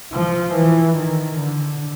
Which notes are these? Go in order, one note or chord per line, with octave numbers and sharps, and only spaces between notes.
F3
E3
D#3
D3